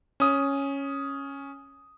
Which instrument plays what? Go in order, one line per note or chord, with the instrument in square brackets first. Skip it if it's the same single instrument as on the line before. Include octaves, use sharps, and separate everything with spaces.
[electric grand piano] C#4 D#6